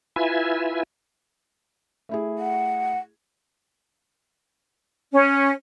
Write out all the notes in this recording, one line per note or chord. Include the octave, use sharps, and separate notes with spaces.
E4 F4 B4 E5 G#5
A3 E4 G#4
F#5
C#4